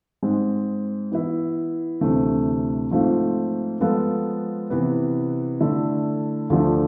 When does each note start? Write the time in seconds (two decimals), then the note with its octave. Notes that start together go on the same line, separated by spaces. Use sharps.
0.23 G#2 G#3 C4
1.12 E3 B3 E4
2.01 D2 C3 E3 A3 C4
2.91 G#2 F3 A3 C4 F4
3.81 F3 G#3 B3 F4 A4
4.70 C3 E3 B3
5.60 D3 A3 E4 A4
6.50 D2 D3 F3 A3